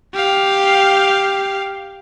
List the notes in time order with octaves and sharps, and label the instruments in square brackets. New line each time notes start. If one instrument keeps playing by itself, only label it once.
[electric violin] G4 F5